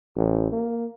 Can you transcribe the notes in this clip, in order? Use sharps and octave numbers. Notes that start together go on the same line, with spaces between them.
A1
A#3